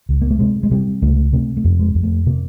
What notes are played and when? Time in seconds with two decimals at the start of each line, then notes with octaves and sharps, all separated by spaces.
0.09 C#2
0.21 A#3
0.31 A3
0.39 C3 G#3
0.63 G#3
0.71 C3 G3
1.02 C#2 A3
1.33 C3 A3
1.57 A3
1.64 F2
1.79 G#3
1.95 F2
2.03 A3
2.26 C3 A#3